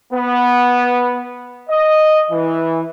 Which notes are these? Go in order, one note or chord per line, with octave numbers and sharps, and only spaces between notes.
B3
D#5
E3